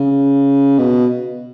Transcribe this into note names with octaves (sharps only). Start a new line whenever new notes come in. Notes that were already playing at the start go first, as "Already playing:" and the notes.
Already playing: C#3
B2